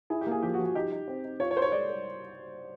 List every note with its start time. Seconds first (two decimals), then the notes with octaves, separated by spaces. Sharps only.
0.10 E4 G#4
0.21 G4
0.27 A#3 G#4
0.43 F3 G4
0.54 F#4
0.59 F3
0.65 F#4
0.75 D#4 G4
0.92 D#4
1.08 C4
1.24 D#4
1.40 F4 C#5
1.51 C#5
1.56 A#4 C5
1.62 C#5
1.72 G#3 D5
1.89 A#4